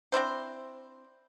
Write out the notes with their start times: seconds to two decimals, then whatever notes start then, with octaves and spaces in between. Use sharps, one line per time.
0.12 C4 D4 E4 C5